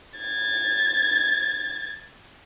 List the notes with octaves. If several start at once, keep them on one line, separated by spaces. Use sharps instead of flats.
G#6 A6